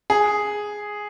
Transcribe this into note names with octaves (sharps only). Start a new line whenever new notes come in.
G#4